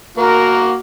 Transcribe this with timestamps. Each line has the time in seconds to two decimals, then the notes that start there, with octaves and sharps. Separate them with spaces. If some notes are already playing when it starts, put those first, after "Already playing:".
0.17 A#3 F#4 A#4